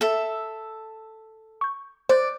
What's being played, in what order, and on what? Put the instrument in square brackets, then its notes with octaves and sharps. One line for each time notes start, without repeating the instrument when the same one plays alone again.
[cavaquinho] A4 E5
[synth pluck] C#6 G6
[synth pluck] C5 F#6 G6 [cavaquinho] D5